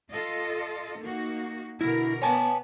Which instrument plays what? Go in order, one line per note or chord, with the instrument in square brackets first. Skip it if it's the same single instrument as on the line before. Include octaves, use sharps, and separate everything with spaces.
[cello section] F4 A4 D#5
A#3 D#4 F#4
[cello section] B2 D3 A#4 [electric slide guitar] E4
[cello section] B3 [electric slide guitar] C#5 G#5 A5